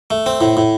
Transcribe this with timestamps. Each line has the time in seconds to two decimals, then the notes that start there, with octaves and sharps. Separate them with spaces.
0.11 A3
0.26 C4
0.41 A2
0.57 A2